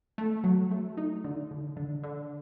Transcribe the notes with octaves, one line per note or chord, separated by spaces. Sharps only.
A3
F#3
A3
D#4
D3
D3
D3
D3